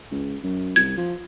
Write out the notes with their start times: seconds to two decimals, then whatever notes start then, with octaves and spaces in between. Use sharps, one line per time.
0.12 C#2
0.44 F#2
0.76 C2 G#6
0.98 F3